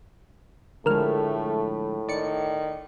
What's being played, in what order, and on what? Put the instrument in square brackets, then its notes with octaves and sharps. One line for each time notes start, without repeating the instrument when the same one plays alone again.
[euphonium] A2 [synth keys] D3 F3 G#3 [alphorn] A3 [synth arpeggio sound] A#4 F6
[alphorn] D#3 [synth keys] D5 C#7